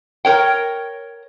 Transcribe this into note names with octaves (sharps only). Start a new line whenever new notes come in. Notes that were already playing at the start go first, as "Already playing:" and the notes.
A#4 C#5 G5